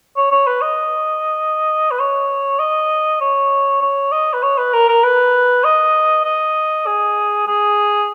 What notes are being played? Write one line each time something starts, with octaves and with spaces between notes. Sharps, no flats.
C#5
C#5
B4
D#5
B4
C#5
D#5
C#5
C#5
D#5
B4
C#5
B4
A#4
A#4
B4
D#5
D#5
G#4
G#4